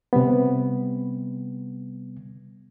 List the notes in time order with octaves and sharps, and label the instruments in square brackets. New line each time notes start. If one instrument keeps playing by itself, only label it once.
[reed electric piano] C3 G3 B3